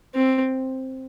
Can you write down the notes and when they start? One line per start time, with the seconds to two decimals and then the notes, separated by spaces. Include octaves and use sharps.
0.15 C4